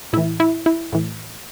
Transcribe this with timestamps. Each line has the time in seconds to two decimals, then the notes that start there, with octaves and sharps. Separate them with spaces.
0.13 A2 E3 E4
0.40 E4
0.66 E4
0.93 A2 E3